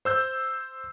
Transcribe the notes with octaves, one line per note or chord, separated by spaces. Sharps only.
C5 E6 G6